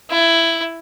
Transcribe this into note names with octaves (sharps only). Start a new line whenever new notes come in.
E4